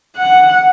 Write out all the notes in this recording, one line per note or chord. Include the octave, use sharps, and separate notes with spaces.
F#5